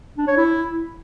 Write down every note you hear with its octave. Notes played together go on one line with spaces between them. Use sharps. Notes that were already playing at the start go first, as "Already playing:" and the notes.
D4
C#5
E4